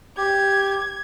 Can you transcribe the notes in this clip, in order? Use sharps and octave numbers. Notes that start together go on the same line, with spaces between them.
G4 G#6